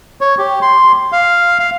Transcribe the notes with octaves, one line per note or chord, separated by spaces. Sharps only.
C#5
G4
C6
F5
F5